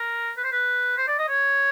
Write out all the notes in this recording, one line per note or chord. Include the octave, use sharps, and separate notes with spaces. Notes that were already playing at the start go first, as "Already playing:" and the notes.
Already playing: A#4
B4
C5
B4
C5
D5
D#5
C#5